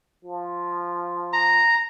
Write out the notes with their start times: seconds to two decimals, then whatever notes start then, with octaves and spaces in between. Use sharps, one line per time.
0.24 F3
1.33 A#5